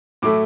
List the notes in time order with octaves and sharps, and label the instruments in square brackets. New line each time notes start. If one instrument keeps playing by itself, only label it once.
[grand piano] A2 F#3 A3 E4 D6